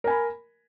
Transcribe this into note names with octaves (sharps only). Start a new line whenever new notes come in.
A#4 G#5 B5